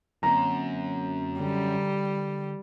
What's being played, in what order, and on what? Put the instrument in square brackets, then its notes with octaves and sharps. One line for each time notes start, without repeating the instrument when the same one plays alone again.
[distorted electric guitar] F#2 [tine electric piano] D3 A#3 C4 [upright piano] A#5
[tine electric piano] D3 [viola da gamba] G3